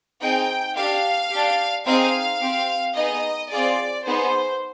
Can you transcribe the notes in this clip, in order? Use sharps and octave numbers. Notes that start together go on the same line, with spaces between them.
C4 D#4 G#4 G5
D4 G4 F5
D4 G4
C4 D#4 G#4 F5
C4 G4
B3 D#4 G#4 D#5
C4 F4 G#4 D5
B3 D#4 G#4 C5